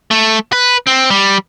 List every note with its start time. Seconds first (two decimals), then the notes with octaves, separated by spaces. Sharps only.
0.11 A3
0.52 B4
0.87 C4
1.10 G3